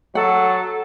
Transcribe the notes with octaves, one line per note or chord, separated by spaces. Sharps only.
F#3 A4 F#5